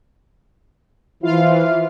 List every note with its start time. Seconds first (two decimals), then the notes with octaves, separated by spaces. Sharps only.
1.23 E3 F3 E4 F4 F5